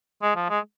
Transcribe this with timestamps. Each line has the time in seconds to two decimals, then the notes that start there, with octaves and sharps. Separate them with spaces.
0.22 G#3
0.36 F3
0.50 G#3